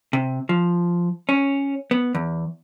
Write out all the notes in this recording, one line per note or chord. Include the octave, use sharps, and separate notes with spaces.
C3
F3
C#4
B3
E2